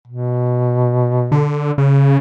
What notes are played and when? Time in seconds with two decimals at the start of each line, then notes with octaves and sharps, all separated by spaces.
0.08 B2
1.32 D3
1.78 C#3